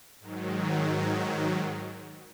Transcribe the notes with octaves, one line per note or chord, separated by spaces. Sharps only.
G#2 D#3 F#3